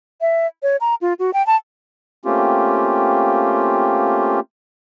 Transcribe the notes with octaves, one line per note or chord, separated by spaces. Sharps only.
E5
C#5
A#5
F4
F#4
G5
A5
A3 A#3 C4 C#4 F4 G4